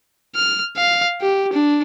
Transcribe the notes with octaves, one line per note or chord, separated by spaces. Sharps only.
F6
F5
G4
D4